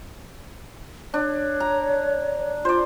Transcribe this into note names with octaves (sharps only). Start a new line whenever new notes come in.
D4 C#5
A#5
F4 C5 D5